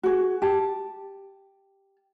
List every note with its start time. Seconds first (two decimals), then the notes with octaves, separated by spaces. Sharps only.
0.03 F#4 G#4
0.42 G4 A5